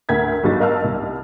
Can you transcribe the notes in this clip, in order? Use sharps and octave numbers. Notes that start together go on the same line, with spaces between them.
D2 A#4 G#6 B6
G1 F#3 D#4 A6
A#4 D#5 F5 A5 E6 F6
C2